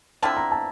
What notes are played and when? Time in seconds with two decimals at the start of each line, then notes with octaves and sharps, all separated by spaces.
0.22 D3 F3 C4 E4 A5
0.37 A#5
0.52 A5